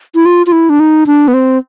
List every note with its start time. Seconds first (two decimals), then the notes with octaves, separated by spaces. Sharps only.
0.15 E4
0.25 F4
0.47 F4
0.52 E4
0.70 D4
0.80 D#4
1.07 D4
1.28 B3
1.34 C4